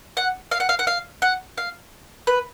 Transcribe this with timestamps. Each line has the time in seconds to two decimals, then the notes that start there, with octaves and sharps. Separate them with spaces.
0.17 F#5
0.51 F5
0.60 F#5
0.69 F5
0.79 F#5
0.87 F5
1.22 F#5
1.58 F5
2.27 B4